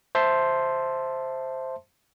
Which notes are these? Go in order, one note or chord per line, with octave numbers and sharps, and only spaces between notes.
C5 E5 A5 C6